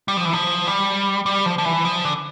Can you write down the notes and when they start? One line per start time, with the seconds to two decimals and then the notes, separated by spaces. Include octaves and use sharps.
0.08 G3
0.17 F3
0.25 E3
0.33 F3
0.67 G3
1.26 G3
1.46 F3
1.58 F3
1.65 E3
1.85 F3
2.05 D3